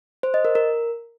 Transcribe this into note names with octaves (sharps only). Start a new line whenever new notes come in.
C5
D#5
A#4
A#4